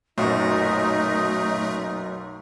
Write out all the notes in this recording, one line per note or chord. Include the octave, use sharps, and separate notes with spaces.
B1 F#2 A#2 A3 D#4 F#4 C5